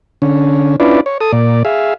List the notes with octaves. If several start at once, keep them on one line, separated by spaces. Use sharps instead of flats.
D3 C#4
C#4 D4 E4 F4 B4 D5
C#5
A4 D#6
A#2 D5
G#4 E5 F5